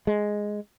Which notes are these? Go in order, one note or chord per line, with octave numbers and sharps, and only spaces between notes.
G#3